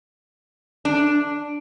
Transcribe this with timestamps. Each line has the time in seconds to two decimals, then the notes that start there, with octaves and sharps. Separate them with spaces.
0.85 D4